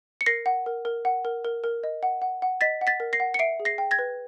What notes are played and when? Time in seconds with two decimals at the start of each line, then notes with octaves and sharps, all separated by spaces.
0.21 C#7
0.26 A#4 A#6 C7
0.46 F#5
0.66 A#4
0.85 A#4
1.05 F#5
1.25 A#4
1.45 A#4
1.64 A#4
1.84 D#5
2.03 F#5
2.22 F#5
2.42 F#5
2.61 D#5 A6 B6
2.81 F#5
2.87 A6 B6
3.00 A#4
3.13 A#6 C7
3.20 F#5
3.34 C#7
3.39 E5 C7 D7
3.60 G#4
3.65 A#6 C7
3.78 G5
3.91 G#6 A#6
3.99 B4